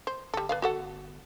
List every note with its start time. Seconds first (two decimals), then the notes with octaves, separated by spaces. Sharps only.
0.07 C5
0.34 G1 G3 A4
0.49 B4 D5 F5
0.62 F#4 A4 F#5